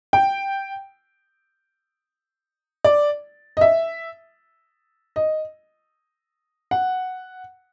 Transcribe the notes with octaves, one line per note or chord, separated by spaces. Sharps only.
G5
D5
D#5
E5
D#5
F#5